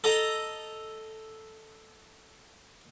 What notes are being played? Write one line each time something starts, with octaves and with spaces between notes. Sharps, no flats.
A4 D#5 A#5